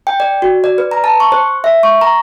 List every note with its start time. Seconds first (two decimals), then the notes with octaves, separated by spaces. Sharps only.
0.07 G5
0.20 D5
0.42 F#4
0.64 D5
0.78 B4
0.91 A#5
1.04 A5
1.20 C#6
1.32 C5
1.64 E5
1.83 C#6
2.01 A#5